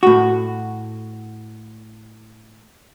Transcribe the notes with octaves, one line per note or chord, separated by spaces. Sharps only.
A2 F#4